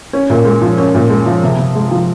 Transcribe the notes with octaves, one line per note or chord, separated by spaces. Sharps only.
C#4
A#2
G#3
F3
C#4
A#2
G#3
F3
C3
C3
G#3
F3